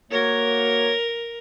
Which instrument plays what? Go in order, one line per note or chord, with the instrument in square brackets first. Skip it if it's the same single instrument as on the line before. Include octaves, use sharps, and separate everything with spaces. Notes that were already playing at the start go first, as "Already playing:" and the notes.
[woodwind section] A#3 F#4 C#5 [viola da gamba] A#4